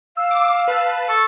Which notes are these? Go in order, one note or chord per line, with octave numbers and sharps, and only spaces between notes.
F5 E6
D6
B4 A5
A4 C#6